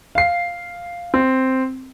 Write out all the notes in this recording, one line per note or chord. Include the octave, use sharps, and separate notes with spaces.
F5 C7
C4